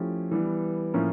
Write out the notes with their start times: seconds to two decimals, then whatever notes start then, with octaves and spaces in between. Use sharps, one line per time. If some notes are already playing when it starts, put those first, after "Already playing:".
Already playing: F3 A3 C#4 E4 G4
0.31 E3 G3 B3
0.94 A2 F3 A#3 C#4